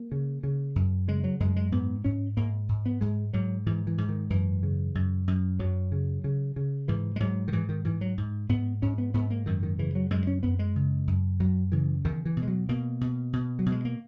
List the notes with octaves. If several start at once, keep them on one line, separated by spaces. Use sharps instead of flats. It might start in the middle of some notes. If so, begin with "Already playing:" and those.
Already playing: A#3
C#3
C#3
F#2
C#3 G#3
F#3
F#2 G#3
G#3
G#2 B3
G#2 C#4
G#2 A#3
G#2
B3
G#2 G#3
G#2 F#3
G#2 E3
E3
G#2
D#3
F#2 E3
C#3
F#2
F#2
F#2 F#3
C#3
C#3
C#3
G#2 E3
G#3
G#2 F#3
D#3
G#2 E3
D#3
G#2 E3
F#3
G#2
G#2 B3
G#2 C#4
B3
G#2 B3
A#3
F#2 D#3
D#3
C#3 E3
F#3
F#2 G#3
C#4
F#2 B3
G#3
C#3
F#2
F#2 F#3
C#3 E3
E2 D#3
E3
B2
G#3
F#3
B2 A#3
B2
B2
F#3
B2
G#3
A#3